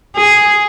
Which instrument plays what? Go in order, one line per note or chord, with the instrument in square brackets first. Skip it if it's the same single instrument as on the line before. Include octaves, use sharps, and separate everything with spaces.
[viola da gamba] G#4